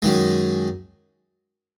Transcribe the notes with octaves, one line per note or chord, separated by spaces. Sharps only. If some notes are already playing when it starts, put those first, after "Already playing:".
F#2 D#3 G#3